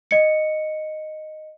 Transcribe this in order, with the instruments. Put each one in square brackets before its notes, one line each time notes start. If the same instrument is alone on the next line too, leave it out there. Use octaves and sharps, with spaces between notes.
[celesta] D#5 C#7